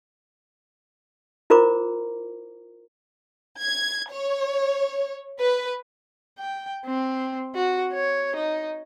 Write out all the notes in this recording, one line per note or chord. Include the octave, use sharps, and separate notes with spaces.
E4 F4 A#4 C5 A#5 D6
G#6
C#5
B4
G5
C4
F#4
C#5
D#4